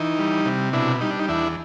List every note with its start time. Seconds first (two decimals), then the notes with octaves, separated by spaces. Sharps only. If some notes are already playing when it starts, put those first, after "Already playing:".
Already playing: E3 D#4
0.19 G3
0.46 C3
0.73 B2 D4 E4
1.01 G3 D#4
1.10 D4
1.19 D#4
1.28 E2 D4 E4